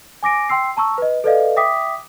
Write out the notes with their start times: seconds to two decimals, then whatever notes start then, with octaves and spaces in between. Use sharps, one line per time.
0.23 G#5 D6 A#6 D7
0.49 G5 C6 E6 C7
0.77 A5 A#5 C#6 E6
0.98 B4 D#5
1.24 A4 B4 D5 D#5 F5
1.56 E5 G5 D6 D#6 B6